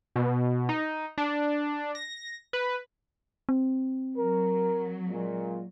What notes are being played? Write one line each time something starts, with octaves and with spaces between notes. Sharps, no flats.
B2
D#4
D4
A#6
B4
C4
F#3 A#4
A#2 G#3